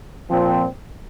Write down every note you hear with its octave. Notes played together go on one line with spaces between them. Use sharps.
A#2 F3 C4